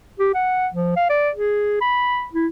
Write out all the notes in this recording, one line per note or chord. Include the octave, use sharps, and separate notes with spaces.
G4
F#5
F3
F5
D5
G#4
B5
E4